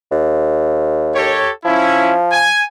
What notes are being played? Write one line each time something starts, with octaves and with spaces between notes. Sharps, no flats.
D#2
G4 A4 C#5
F3 C#4 E4
G#5